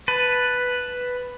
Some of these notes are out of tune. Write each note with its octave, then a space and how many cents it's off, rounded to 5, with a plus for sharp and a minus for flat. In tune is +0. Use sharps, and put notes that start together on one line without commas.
B4 +0 A5 +0